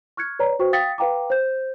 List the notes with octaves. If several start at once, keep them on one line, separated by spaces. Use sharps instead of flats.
C#6 F6 F#6 G#6 C#7
B4 C#5 D5 A#5
F#4 B4 C5 G5 C#6
F5 G5 D#6 A6 B6 C#7
B4 F5 G5 A#5 D6
C5 G6